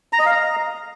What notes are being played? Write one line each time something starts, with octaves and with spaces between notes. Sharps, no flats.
A#5
D#5
F5
A#5